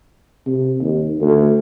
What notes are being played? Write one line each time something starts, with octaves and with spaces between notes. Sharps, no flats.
C3
D#2
D2